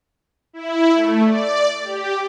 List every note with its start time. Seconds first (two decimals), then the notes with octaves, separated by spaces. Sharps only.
0.53 E4
0.94 A3
1.25 D5
1.84 G4